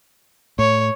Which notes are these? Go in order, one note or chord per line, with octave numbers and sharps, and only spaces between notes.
A2 C#5